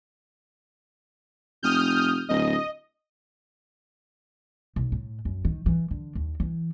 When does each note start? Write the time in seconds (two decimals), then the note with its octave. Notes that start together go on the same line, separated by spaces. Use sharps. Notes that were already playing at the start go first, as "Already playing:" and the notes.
1.63 F1 D#6 F6 G6
2.29 D1 D#5
4.76 B1
4.92 A2
5.25 F#2
5.45 D#3
5.66 E3
5.91 D3
6.15 D#2
6.40 E3